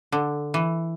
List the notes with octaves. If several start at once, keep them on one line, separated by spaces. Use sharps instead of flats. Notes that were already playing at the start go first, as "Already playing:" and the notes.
D3
E3